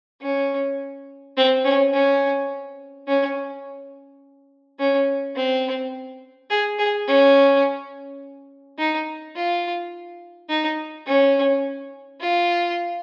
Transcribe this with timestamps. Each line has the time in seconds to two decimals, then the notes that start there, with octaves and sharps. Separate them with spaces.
0.22 C#4
1.37 C4
1.65 C#4
1.94 C#4
3.08 C#4
4.79 C#4
5.36 C4
6.50 G#4
6.79 G#4
7.07 C#4
8.79 D#4
9.36 F4
10.49 D#4
11.07 C#4
12.21 F4